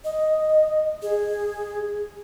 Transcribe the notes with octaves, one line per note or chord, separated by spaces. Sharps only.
D#5
G#4